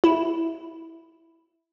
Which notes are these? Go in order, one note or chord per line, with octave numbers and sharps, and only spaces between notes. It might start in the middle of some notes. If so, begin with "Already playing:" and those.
E4